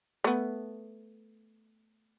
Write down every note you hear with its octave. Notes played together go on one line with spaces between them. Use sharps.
A3 B3